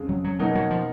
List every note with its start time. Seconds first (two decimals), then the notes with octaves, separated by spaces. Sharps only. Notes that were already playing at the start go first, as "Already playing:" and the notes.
Already playing: F2 C#3 G#3
0.09 F#3
0.24 F#3
0.39 B2 F#3 A#3 D#4 F#4 A#4
0.55 F#3
0.71 F3